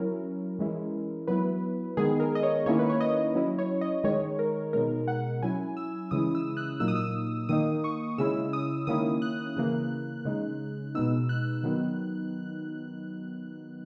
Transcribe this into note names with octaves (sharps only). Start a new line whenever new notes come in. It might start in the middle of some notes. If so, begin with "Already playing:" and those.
Already playing: F#3 C#4 E4 A#4
E3 G#3 C#4 E4
F#3 B3 E4 B4
D#3 G#3 B3 G#4
A#4
D#5
C#5
D#3 A#3 C#4 E4 C#5
B4
C#5
D#5
F#3 C#4 E4
C#5
D#5
D#3 G#3 D#4 C#5
A#4
B2 G#3 D#4 A#4
F#5
F#3 C#4 E4 G#5
E6
C#3 E3 G#3 C#4 E4 D#6
E6
F#6
A#2 F#3 A#3 D#4 E6
D#6
E6
D#3 A#3 D#4 D#6
C#6
C#3 G#3 C#4 E4 E6
D#6
D#3 A#3 C#4 E4 D#6
F#6
C#3 E3 A#3
C#3 G#3 D#4
B2 G#3 B3 D#4 E6
F#6
D#3 F#3 B3 D#4